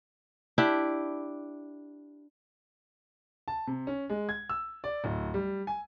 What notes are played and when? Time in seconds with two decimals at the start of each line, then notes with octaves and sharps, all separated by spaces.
0.58 D4 E4 G4
3.48 A5
3.67 C3
3.87 C#4
4.10 G#3
4.29 G#6
4.50 E6
4.84 D5
5.04 D1
5.34 G3
5.67 G#5